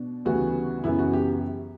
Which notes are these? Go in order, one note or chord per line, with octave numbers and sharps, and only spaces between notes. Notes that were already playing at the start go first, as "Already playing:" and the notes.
Already playing: B2 D4
D2 C#3 E3 G3 B3 F#4
F#2 C#3 E3 B3 E4
F#4
G4